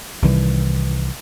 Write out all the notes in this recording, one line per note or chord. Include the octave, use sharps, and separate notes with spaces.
C2 D#3 E3 G3